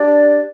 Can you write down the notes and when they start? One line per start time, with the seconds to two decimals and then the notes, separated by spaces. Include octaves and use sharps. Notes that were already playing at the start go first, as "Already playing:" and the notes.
Already playing: D4 G4 D5